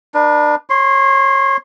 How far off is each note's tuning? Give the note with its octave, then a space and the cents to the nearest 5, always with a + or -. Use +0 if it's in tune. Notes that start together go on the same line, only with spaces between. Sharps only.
D4 +25 B4 -35
C#5 -30 C6 +0